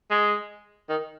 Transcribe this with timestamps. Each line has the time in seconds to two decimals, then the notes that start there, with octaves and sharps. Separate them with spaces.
0.11 G#3
0.89 D#3